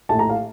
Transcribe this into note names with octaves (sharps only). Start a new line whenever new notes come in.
A#1 A2 A3 A5
A#5
F5